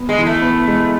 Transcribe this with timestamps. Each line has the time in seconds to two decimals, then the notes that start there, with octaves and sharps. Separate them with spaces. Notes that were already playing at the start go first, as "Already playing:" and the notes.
Already playing: B3
0.09 G#3
0.18 E3
0.26 A3
0.42 B3
0.68 G#3